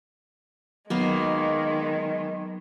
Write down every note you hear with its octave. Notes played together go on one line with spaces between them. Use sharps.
D#3 F#3 G#3 A#3 B3 F5